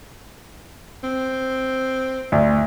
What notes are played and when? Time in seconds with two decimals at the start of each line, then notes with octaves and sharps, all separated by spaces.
1.03 C4
2.32 D2